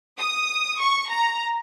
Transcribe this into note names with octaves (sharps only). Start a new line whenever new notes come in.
D#6
C#6
A#5